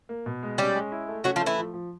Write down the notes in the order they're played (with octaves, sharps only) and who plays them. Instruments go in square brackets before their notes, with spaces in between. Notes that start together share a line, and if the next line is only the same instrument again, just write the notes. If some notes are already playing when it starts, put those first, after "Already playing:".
[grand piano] A#3
B2
G#3
[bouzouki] G3 G4 [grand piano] C#4
[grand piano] G#3
E4
A3
[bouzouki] F#3 F#4 [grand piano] C#4
[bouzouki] F3 F4
[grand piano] A3
[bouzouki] E3 E4
[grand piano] F3
F3